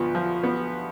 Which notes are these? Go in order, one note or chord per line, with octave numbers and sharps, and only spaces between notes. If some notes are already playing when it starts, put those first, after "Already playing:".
Already playing: D2 F3 B3 F4
F3
B3